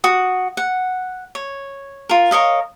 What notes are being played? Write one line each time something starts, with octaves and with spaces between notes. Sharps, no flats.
F#4 D#6
F#5
C#5
F4 A#4
A#4 C#5 D#5 F5